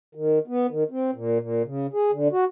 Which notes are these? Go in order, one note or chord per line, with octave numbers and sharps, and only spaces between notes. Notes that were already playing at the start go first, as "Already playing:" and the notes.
D#3
B3
D#3
C4
A#2
A#2
C#3
G#4
D3
F#4